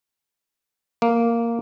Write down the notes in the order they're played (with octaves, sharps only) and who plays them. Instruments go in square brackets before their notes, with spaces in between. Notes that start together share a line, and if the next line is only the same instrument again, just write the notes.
[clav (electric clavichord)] A#3